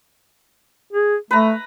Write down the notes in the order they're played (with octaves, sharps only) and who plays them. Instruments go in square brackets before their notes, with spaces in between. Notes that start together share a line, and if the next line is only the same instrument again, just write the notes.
[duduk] G#4
[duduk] A3 [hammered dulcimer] B4 A#5